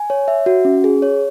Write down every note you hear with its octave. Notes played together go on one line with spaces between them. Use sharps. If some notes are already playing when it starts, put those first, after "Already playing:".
Already playing: G#5
C#5
E5
F#4
C#4
G#4
C#5